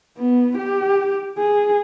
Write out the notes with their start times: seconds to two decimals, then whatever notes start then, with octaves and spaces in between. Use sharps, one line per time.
0.18 B3
0.58 G4
1.38 G#4